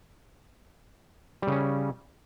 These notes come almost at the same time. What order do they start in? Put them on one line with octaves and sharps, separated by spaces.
G3 C#3 C#4